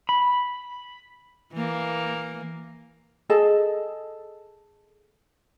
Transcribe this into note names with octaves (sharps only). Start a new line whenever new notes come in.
B5
E3 A#3
G#4 A4 D#5 A5